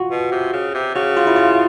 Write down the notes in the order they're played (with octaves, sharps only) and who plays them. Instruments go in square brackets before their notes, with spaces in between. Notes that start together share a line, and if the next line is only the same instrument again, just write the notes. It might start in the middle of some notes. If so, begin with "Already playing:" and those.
Already playing: [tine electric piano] F4 F#4
[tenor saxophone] B2
C3
C#3
C3
[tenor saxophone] C#3 [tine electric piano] F#4
[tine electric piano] F4
E4
F4